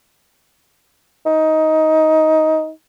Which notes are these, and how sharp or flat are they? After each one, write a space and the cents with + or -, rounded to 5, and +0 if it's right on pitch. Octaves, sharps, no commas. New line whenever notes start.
D#4 +15